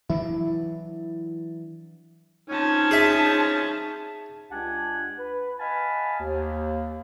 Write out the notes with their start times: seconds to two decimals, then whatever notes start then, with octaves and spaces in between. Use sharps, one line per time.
0.10 E3 F#3 D4 E4
2.49 F3 C4 C#4 D#4 A5
2.91 G#4 E5
4.51 C#2 D4 G4 F#5 G#5 A5
5.18 B4
5.59 D#5 F5 F#5 G#5 A5 B5
6.20 D#2